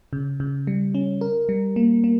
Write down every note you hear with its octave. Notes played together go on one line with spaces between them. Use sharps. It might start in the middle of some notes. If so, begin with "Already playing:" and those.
C#3
C#3
G3
C#4
A#4
G3
A#3
A#3